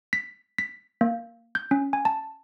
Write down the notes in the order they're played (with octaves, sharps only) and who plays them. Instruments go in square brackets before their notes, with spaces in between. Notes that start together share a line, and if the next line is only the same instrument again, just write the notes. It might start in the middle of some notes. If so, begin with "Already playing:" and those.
[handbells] B6
B6
A#3
G6
C#4
G#5
A5